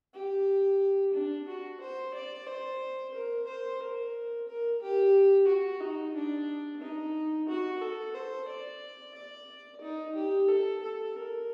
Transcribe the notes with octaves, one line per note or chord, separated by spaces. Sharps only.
G4
D4
F#4
C5
D5
C5
A#4
C5
A#4
A#4
G4
F#4
D#4
D4
D#4
F#4
A4
C5
D5
D5
D#4
G4
A4
A4
A#4